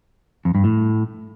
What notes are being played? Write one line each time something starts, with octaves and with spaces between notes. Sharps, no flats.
F2
G2
A2